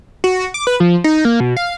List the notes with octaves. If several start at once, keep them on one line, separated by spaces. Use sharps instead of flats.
F#4
D6
B4
F3
D#4
A#3
B2
F5